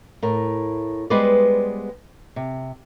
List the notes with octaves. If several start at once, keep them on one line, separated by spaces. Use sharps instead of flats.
A2 A#4
G3 G#3 B3 B4 C5 D5
C3